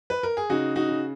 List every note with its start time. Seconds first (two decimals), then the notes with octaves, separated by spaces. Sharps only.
0.10 B4
0.23 A#4
0.37 G#4
0.50 C#3 D#4 F#4
0.76 D#4 F#4
0.89 C#3